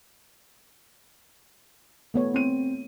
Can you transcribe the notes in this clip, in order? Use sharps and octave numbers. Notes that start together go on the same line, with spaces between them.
A3 B3 C#5
C4 D#7